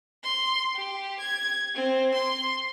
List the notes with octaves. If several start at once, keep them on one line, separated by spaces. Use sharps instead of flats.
C6
G4
G#6
C4
C6